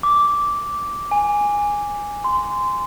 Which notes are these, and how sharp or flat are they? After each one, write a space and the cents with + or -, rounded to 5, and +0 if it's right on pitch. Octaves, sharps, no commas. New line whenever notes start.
D6 -10
G#5 -10
C6 -20